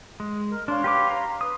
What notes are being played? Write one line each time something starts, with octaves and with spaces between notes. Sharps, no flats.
G#3
A#4
D4 C#5 F5 C6
G4 B4 D6
A#5
B4 D#6